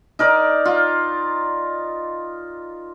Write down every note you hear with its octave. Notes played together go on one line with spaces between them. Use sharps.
D#4 A#4 D5
F4